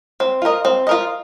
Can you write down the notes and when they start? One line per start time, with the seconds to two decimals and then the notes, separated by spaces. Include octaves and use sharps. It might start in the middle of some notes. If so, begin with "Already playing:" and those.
0.20 C4
0.42 F4 A#4 D#5
0.65 C4
0.87 F4 A#4 D#5